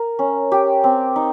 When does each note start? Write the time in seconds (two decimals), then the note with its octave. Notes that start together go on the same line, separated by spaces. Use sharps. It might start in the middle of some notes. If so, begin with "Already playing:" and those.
Already playing: A#4
0.19 C#4
0.52 G4
0.84 C4
1.16 D#4